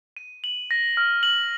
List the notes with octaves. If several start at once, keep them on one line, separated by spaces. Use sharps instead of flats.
D#7
F#7
A#6
F6
F#7